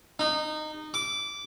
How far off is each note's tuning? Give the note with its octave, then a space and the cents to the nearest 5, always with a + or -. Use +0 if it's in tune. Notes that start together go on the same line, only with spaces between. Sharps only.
D#4 -20
D6 -15